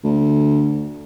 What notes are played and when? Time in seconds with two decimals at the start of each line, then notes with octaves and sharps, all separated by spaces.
0.04 D2